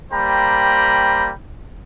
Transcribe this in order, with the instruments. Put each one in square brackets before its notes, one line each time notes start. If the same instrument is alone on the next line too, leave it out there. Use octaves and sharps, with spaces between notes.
[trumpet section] G3 A#3 C5 G5 A#5 B5